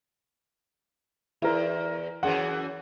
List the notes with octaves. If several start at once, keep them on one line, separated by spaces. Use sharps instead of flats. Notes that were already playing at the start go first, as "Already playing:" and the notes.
E2 E4 A#4
F#2 E3 G#4 F#5